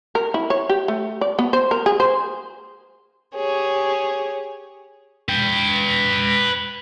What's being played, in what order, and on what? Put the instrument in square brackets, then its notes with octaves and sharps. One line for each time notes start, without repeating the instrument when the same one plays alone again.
[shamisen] A#4
E4
C#5
G4
A3
D5
B3
C5
A#4
G#4
C5
[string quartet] G4 G#4 C#5
[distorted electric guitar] B4 G5